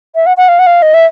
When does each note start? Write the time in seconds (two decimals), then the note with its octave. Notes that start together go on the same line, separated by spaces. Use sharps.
0.15 E5
0.26 F#5
0.37 F#5
0.48 F5
0.59 F#5
0.66 F5
0.82 D#5
0.94 E5